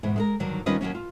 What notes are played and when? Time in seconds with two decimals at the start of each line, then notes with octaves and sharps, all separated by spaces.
0.03 E2 G#2 B2
0.16 G#3 A4 A#4
0.40 G2 D3 D#3 F#3
0.66 D#3 G3 C#4 F4 B4 D#5
0.81 D#2 C#3 F#3 C#4
0.95 F4